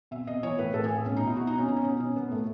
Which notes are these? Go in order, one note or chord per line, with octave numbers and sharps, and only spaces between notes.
B2 E5
B2 D#5
E3 C#5
A2 B4
A2 A4
A2 G#4
B2 C#4
B2 D#4
E4
B2 F#4
D#4
B2
C#4
B2 D#4
C#4
B2 D#4
B2 C#4
B2 B3
A2 A3